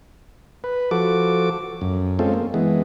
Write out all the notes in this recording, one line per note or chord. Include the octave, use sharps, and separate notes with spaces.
B4
F3 F#4 A4 D6
F#2
G#3 C4 C#4 F4 A4
A#3
E3 G#3 B3